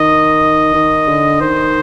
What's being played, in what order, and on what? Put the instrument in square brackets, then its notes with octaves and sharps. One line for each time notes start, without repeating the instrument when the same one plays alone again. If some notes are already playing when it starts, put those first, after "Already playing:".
Already playing: [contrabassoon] D#3 [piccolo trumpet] D#5
[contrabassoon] D#3
D3
[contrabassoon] D#3 [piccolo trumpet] C5